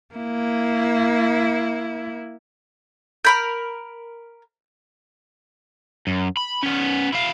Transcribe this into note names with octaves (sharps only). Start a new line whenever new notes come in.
A#3 E4
A#4 B5 F6 G6 B6
F#2
B5
B3 C#4
E4 F5